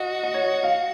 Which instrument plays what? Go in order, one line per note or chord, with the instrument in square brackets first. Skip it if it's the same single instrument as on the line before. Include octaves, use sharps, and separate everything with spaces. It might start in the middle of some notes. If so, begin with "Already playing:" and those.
Already playing: [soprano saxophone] F#4 [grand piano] D#5
[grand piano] D#5
C#5
D#5
F5